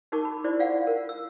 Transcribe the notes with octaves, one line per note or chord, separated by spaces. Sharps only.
D#4 F#4 A#4 A5 C#6 D6
B5
E4 F#4 C5 D5
F4 D5 F5 F#5
A#4
E6